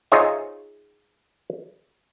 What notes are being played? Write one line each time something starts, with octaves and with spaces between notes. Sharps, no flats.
D#4 F4 G#4 C5 C#5 E5